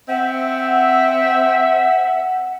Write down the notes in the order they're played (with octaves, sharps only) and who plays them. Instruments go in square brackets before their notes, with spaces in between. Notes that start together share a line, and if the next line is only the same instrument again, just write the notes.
[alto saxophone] C4 [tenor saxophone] E5 [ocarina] F#5